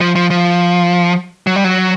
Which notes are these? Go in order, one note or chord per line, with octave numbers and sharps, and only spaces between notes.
F3
F3
F3
F#3
G3
F#3